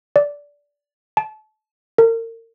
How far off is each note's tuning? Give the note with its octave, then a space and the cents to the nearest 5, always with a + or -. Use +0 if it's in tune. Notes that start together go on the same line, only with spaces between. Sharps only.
D5 -15
A5 -30
A#4 -35